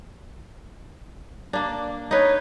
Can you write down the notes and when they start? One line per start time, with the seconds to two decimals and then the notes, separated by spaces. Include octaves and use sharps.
1.53 A#3 D4
2.11 D#4 B4 C#5